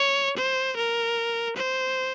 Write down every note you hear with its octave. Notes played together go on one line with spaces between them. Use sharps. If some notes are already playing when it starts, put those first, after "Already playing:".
Already playing: C#5
C5
A#4
C5